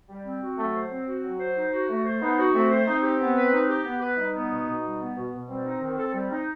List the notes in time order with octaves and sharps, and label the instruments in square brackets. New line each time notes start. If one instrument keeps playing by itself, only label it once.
[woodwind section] G3
C4
F#4
[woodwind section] F#3 [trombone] A3
[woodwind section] C5
C4
F#4
F#3
C5
D#4
F#4
A3
C5
[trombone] B3 [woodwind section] D#4
[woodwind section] F#4
[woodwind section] A3 [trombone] C4
[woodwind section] C5
[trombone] C4 [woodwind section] D#4
[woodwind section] G4
B3
B4
D#4
G4
B3
B4
[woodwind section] G3 [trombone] D#4
[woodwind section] B3
B2
B2
G3
B3
B2
B2
[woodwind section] G3 [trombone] C4
[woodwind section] D#4
D#3
A4
G3
D#4